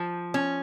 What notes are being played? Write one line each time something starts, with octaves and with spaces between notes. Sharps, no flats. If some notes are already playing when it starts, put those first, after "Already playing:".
Already playing: F3
C#4